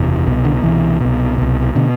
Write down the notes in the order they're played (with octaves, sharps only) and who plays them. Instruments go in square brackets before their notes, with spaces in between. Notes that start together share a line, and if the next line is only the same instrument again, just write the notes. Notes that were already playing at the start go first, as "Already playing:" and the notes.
Already playing: [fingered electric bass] F#1 E2 C3
C2 B2
D3
C2 B2 E3
C2 B2
C2 B2
B2 D3